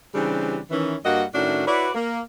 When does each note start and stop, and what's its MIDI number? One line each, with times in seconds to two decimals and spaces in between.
0.15 0.59 49
0.15 0.59 52
0.15 0.59 55
0.15 0.59 60
0.15 0.59 62
0.15 0.59 67
0.70 0.95 51
0.70 0.95 52
0.70 0.95 61
1.04 1.24 43
1.04 1.24 55
1.04 1.24 58
1.04 1.24 66
1.04 1.24 75
1.04 1.24 78
1.34 1.66 45
1.34 1.66 51
1.34 1.66 61
1.34 1.66 62
1.34 1.66 64
1.34 1.66 66
1.67 1.90 64
1.67 1.90 66
1.67 1.90 71
1.67 1.90 73
1.67 1.90 74
1.95 2.20 58